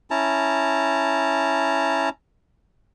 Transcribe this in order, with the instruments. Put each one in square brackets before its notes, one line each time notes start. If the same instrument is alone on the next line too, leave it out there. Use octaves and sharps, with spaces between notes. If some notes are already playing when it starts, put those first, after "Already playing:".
[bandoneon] C#4 E4 A5 A#5